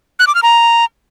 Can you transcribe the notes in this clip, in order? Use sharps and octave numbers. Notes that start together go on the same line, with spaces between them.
F#6
D6
F6
A#5